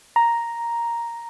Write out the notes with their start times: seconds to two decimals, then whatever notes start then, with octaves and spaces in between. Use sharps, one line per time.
0.16 A#5